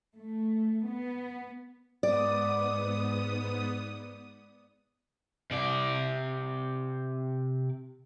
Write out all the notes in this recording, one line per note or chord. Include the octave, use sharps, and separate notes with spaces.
A3
B3
G#2 B3 D5 D#6
C3 D5